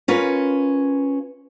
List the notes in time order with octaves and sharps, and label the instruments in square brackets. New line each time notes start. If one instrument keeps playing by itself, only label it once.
[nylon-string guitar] C#4 F4 A#4 B4